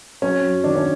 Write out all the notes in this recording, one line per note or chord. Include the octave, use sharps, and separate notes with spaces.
F#3 C#4
F#2
D#3 D4
C#4